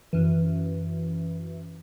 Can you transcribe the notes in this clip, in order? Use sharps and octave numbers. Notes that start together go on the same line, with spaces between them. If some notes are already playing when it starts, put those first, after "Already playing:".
F#2 E3